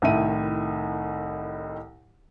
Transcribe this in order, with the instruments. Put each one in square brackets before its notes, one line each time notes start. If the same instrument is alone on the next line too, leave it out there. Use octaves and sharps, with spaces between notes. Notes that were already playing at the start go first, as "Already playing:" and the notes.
[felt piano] C2 A2 D#3 E5 D#7